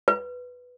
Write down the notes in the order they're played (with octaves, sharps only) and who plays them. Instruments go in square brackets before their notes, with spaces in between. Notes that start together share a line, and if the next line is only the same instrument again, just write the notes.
[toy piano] B4